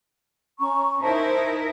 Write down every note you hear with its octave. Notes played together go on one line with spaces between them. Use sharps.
C#4 A#5 C#6
D#4 E4 A#4 C5 A5